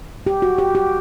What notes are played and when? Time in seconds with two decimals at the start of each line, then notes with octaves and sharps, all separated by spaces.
0.27 G4
0.42 F#4
0.58 G4
0.75 G4